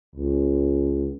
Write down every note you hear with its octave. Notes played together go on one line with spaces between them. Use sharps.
C#2